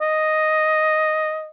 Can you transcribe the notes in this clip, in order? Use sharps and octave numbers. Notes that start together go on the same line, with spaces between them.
D#5